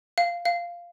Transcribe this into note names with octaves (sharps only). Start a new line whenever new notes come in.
F5
F5